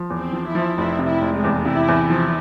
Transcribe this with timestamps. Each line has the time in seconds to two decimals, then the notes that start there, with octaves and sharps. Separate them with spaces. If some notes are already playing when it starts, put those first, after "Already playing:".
Already playing: F3
0.10 E2
0.18 C4
0.33 F3
0.48 E4
0.55 F3
0.77 F1 E4
0.99 C3
1.07 E4
1.21 F1
1.36 G#3
1.44 E2
1.65 C3 E4
1.88 E2
2.10 F3 E4